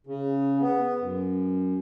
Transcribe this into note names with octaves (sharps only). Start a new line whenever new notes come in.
C#3
B3
F#2